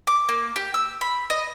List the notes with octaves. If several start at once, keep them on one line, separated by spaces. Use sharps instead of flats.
D6
A#3
G4
E6
B5
D#5